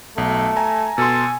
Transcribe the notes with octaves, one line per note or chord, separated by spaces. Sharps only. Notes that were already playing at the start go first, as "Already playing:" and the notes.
B1 A3
G#5 A#5
B2 A4 G#5 C6